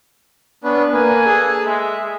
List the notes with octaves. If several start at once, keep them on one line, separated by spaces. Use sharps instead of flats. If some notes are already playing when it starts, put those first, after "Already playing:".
B3 C#4 D4 B4
A#3 B4 G#5
G#4 A4
G#3 E5